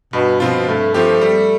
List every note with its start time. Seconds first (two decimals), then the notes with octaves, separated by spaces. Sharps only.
0.13 G2 B2
0.40 B2 F3 C4 F4
0.67 G2 A3
0.94 F3 A3 C4 G4
1.21 G3